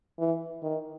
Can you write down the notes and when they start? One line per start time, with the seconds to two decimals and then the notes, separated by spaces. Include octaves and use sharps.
0.19 E3
0.63 D#3